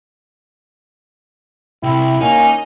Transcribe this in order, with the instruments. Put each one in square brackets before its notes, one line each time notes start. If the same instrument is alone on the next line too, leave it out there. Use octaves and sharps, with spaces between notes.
[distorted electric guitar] C2 C3 [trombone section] E4 [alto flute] G5
[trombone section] D#2 A#3 C#4 [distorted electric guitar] D#4 [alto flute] G#5